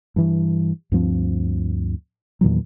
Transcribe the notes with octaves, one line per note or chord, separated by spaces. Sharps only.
G2 E3
D2 G2 F3 C4
E2 A#2 D#3 F#3